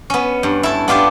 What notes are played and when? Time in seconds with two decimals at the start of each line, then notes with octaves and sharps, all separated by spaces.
0.10 B3 C#4
0.43 G2
0.63 E4 A4
0.88 B3 D4 F4 G4